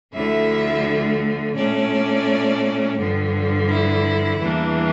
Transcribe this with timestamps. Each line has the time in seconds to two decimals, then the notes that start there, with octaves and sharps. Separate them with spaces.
0.14 D2 D3 F3 A3 E4 E5
1.55 A#2 A3 C#4 D4 D5
2.97 G2 D3 F3
3.68 E4
4.39 E2 E3 G3 A#3 D4